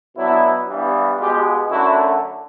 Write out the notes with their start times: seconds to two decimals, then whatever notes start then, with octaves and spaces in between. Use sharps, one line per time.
0.16 B2 F#3 B3 D4 E4
0.68 G2 E3 G3 B3
1.19 B2 G#3 B3 F4 G4
1.70 F#2 D3 F#3 A3 E4 F#4